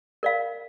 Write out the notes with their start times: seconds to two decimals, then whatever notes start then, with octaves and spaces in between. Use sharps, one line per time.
0.23 A#4 D5 F5